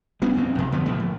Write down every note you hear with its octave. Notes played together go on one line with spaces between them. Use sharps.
G3 B3 C#4 D4
D#1 F2 D#3 C4
G#1 F2 C3 F3
D2 D3 B3
B1 A2 F3 A3
A#1